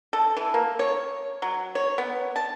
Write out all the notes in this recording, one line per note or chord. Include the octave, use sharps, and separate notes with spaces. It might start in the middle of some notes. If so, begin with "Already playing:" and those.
A4
E3
A#3
C#5
F#3
C#5
B3
A5